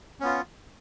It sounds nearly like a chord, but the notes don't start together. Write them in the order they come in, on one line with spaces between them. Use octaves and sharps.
C#4 B3 F4